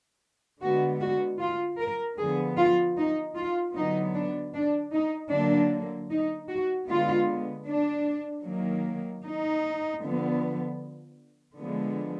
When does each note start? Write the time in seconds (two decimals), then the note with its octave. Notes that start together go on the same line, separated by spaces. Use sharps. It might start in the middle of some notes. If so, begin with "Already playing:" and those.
0.62 D3 G#3 B3 F#4
1.01 F#4
1.40 F4
1.79 A#4
2.19 D3 F3 B3 G#4
2.57 F4
2.97 D#4
3.37 F4
3.75 D3 F#3 B3 D#4
4.14 D4
4.54 D4
4.93 D#4
5.32 D3 F#3 A#3 D4
6.11 D#4
6.50 F#4
6.89 D3 G#3 B3 F4
7.67 D4
8.45 D#3 F#3 A#3
9.24 D#4
10.02 D3 F3 B3
11.59 D3 F3 G#3 B3